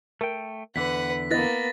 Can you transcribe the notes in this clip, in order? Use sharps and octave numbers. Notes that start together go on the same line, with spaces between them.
A3 A#4 G5
E2 D3 B4 F#5 B6
A#3 B3 E4 B4 D#5 A6 A#6